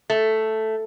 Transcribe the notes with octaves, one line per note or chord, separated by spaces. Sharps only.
A3